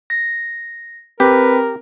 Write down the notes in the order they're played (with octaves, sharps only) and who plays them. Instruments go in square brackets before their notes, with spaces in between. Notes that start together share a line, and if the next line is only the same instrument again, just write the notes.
[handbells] A#6
[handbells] C4 [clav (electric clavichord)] G4 [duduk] A#4 [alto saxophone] B4